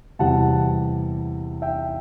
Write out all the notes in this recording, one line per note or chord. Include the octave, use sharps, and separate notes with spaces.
E2 C3 G3 F#5 A5
E5 G5